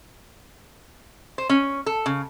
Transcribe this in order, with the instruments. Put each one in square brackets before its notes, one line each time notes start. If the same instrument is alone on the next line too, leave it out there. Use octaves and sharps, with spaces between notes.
[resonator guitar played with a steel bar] C5
C#4
A4
C#3